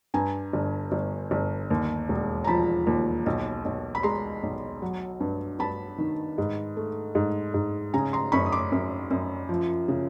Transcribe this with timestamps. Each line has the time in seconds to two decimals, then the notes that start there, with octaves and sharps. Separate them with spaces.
0.14 G2 G#5 A#5
0.53 G1
0.92 G1
1.31 G1
1.71 D#2
2.09 E1
2.44 A#5
2.47 F3 A5 B5
2.87 D#2
3.26 B1
3.65 B1
3.95 B5
4.03 G#3 A#5 C6
4.43 B1
4.82 F#3
5.20 G2
5.59 G2 A5 B5
5.98 D#3
6.38 G#2
6.77 A3
7.15 G#2
7.54 G#2
7.94 C#3 G#5 A#5
8.13 A#5 C6
8.32 F#2 B5 C#6
8.46 D#6
8.52 C6 D6
8.72 F#2
9.10 F#2
9.49 F3
9.88 C#3